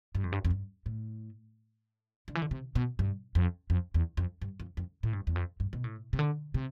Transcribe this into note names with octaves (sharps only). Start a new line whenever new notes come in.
G2
F2
G2
F2
G2
A2
D3
E3
D3
C3
B2
G2
F2
F2
E2
F2
G2
F2
F2
A2
G2
E2
F2
G2
B2
A2
C3
D3
C3